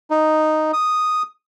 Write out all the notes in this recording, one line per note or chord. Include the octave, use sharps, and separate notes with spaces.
D#4
D#6